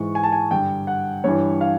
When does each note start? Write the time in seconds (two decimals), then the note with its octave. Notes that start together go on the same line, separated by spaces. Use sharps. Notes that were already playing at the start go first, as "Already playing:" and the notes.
Already playing: G#2 E3 C#6
0.15 G#5
0.23 A5
0.32 G#5
0.51 G2 D3 G5
0.87 F#5
1.24 G2 E3 C#5
1.61 F5